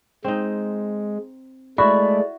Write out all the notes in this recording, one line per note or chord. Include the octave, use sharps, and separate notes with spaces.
G#3 C4 D#4
G#3 A3 E4 F#4 D5 B5